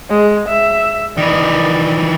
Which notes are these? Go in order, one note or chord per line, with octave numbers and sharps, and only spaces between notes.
G#3
E5
D#3 E3 D5